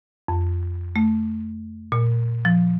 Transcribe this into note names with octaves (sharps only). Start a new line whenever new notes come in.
F2
A3
A#2
F3